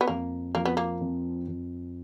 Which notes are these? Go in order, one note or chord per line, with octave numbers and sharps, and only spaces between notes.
B3
F2 A#3
F3 A#3
B3
A#3
F2
F2